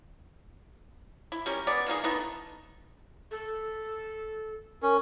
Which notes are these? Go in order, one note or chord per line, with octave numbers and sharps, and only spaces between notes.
E4
G3 C#4 A#4
G#3 B3 G#4 D5
E3 A#3 D#4 G#4
A3 B3 D#4 E4
A4
C#4 A#4